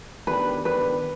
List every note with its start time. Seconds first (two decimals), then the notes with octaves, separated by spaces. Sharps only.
0.27 D#3 B3 D4 G4 B4
0.65 D#3 B3 D4 G4 B4